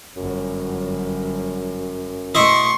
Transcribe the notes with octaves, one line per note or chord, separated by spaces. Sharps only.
G1 F#2 F#3
B2 A3 E4 D#5 C6 C#6